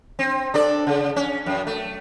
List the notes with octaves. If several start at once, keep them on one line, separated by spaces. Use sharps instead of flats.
C4
D4 A4 D5
C#3
C#4
F#2
A3